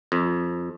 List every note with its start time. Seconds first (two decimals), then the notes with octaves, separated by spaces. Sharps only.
0.12 F2